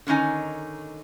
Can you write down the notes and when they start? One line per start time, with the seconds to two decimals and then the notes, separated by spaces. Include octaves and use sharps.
0.07 D3 D#3 C#4 D#4 G#5